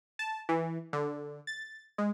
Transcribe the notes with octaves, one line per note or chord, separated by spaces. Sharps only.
A5
E3
D3
A6
G#3